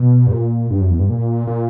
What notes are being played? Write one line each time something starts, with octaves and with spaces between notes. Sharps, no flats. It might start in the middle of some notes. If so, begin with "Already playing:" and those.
Already playing: B2
G2
A#2
G2
F#2
E2
G2
A#2
A#2